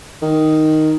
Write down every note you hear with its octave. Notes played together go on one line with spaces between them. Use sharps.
D#3